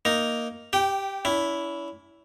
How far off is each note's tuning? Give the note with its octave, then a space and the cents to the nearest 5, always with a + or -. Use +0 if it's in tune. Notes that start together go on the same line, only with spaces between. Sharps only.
A#3 +0 D#4 +0
G4 +0 G5 -20
C#4 +40 E4 +0